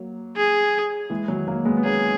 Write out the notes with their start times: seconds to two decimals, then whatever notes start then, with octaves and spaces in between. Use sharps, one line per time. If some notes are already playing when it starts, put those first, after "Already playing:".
Already playing: F#3 A#3
0.36 G#4
1.10 E3 G#3
1.28 D#3 F#3
1.48 F#3 A#3
1.65 G#3 B3
1.77 B3
1.84 A#3 C#4 G#4